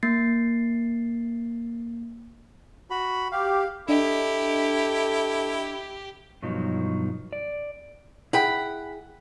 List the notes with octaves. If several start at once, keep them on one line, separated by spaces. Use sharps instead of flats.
A#3 A6 C7
F#4 B5
G4 F5
D4 E4 G4 A4 D#5
G2 B2 F3 F#3 D#4
D5
E4 G#4 F#5 G5 B5